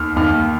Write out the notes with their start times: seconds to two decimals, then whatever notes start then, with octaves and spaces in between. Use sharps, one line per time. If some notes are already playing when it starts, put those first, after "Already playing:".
Already playing: D#2 D#3 F6
0.16 D#2 D#3 F6